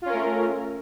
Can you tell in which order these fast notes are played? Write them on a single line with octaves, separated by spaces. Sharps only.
F4 C#4 A#4 A3